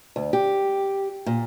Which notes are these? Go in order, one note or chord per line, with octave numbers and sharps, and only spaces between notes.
D2
G4
A#2